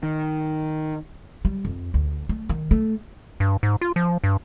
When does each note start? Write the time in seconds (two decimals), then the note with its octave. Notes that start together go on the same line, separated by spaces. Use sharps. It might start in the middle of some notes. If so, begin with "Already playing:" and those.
0.03 D#3
1.45 G3
1.65 F2
1.94 D2
2.29 A3
2.49 D#3
2.71 A3
3.40 G2
3.63 G#2
3.81 F4
3.96 F3
4.24 G2